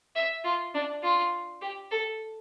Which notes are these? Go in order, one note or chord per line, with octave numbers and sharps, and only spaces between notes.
E5
F4
D4
F4
G4
A4